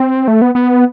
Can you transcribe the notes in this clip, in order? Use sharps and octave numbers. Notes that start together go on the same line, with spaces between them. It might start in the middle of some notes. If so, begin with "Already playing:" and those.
Already playing: C4
A3
B3
B3